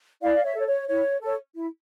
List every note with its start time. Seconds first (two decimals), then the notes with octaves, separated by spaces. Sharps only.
0.22 E4 D5 F5
0.35 F5
0.44 C#5 E5
0.55 A4 C#5
0.66 C#5
0.88 E4 C#5
1.21 A4 C#5
1.54 E4